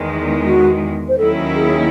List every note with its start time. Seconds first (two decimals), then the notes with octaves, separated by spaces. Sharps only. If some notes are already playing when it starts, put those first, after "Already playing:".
Already playing: E2 D#3 G#3
0.45 F#4
1.08 C5
1.18 D#2 D#3 F#3 C#4 E4 A4
1.55 G#4